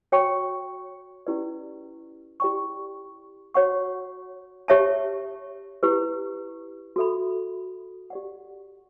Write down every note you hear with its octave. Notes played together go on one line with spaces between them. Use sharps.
F#4 C#5 G5 C#6
C#4 E4 G4 B4 D5
E4 G4 D5 G5 C#6
F#4 C#5 F#5 C#6
G4 C#5 E5 A5
E4 G4 B4
F#4 A4 E5 B5
G4 D5 F#5